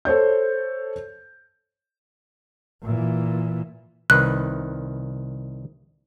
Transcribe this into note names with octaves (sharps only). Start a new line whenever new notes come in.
A4 C5 C#5 G6
A#2 E3
C2 D#3 B4 F#6